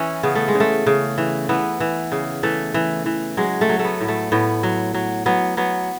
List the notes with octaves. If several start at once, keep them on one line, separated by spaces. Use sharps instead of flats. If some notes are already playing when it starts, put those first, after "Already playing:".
Already playing: E3 C#4 E4
C#3 B3
A3
G#3
C#3
A3
C#3
E3
E3 B3
E3
C#3
E3 A3
E3
E3
F#3 G#3
A3
F#3
A3
B3
A2
A3
A2 B3
F#3
F#3
F#3 B3
F#3 B3